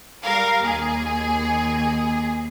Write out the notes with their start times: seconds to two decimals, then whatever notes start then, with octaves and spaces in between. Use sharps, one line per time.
0.23 G3 A#4 F5
0.60 D#2 G#4